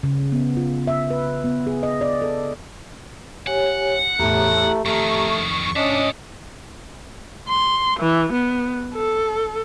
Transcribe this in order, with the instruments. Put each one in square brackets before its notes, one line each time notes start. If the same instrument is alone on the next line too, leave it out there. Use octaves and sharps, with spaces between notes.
[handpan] C#3
B3
F4
E5
B4
B3
G#4
D#5
D5
A4
[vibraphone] G4 C#5 G#5 [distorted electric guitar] F#5
[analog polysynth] E2 A2 [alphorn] A3 [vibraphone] G4 A#5
[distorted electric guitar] F2 D#3 [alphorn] A3 [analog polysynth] C#6
[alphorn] C#4 [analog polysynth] D4 [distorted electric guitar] C#5 E5 [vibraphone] D#5 D#6
[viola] C6
E3
B3
A4